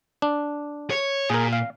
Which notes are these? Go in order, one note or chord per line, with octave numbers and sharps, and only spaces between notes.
D4
C#5
A#2 G#4 A#4
F5